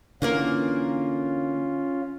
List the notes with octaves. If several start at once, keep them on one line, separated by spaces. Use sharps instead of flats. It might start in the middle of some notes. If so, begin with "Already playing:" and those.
D3 E3 A#3 C#4 F4 A#4